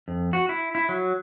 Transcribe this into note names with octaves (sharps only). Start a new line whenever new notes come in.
F2
F#4
E4
E4
F#3